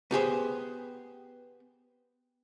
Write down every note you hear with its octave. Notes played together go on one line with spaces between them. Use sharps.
B3 G4 G#4 C5